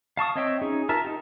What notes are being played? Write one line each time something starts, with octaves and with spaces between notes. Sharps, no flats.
F5 A5 C#6 D#6
C4 C#5 D#5 E5 G5
C#4 D#4 G#4
F4 A#4 E5 A5
D#4 G4